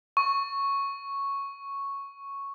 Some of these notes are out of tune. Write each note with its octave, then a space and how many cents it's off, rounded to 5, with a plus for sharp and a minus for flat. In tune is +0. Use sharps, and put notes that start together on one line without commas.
C#6 -5